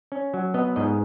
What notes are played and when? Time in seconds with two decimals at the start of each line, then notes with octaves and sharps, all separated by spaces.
0.12 C#4
0.34 F#3
0.54 B3 D#5
0.76 G#2 D#5